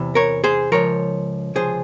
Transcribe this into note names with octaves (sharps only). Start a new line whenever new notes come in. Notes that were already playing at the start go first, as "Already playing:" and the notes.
Already playing: E2 C3 E3
A#4 C#5
G#4 C5
C#2 C#3 F3 A#4 C#5
C#2 C3 F3 G#4 C5